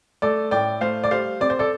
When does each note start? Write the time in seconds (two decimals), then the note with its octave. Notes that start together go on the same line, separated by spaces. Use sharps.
0.22 A3 A4 D5
0.51 A2 D5 G5
0.81 A3 C5 F5
1.04 D5
1.11 G3 C5 F5
1.40 C4 D5
1.50 C5
1.59 A4 D5